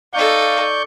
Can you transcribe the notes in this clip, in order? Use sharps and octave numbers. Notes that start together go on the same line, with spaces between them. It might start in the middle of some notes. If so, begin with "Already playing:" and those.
D#4 A4 D5 F5 C#6 G6